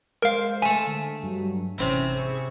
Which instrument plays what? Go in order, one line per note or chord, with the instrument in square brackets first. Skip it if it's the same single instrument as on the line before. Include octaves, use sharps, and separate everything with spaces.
[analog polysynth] G#3 C5 [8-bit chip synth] A#4 F5
[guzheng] A3 E5 [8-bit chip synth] G#5
[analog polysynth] D3
G2 F#3
[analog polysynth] G#1 E3 C#4 [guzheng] C3 C4 E4
[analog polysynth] G#4 B5 C#6